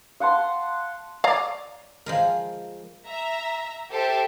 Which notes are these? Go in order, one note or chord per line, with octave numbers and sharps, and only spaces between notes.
F5 F#5 A5 C6
C#5 D5 F5 A#5 D6
F3 G#3 A#4
E5 A#5
G4 A4 C5 E5